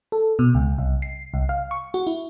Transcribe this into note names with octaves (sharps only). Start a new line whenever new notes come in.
A4
B2
C#2
C2
C7
C2
F5
C#6
F#4
E4